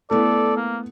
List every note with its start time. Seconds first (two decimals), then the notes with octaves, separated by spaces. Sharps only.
0.11 A3 B3 E4 A4 D5
0.57 A#3